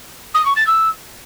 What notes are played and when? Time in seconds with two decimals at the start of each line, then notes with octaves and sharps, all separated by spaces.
0.34 D#6
0.45 C#6
0.56 A6
0.66 E6